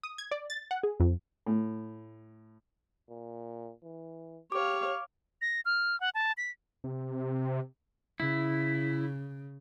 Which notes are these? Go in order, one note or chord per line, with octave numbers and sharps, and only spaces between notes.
D#6
G#6
D5
A6
F#5
G#4
F2
A2
A#2
E3
G4 C#5 F5 D6
A#6
F6
F#5
A5
B6
C3
C#3 E4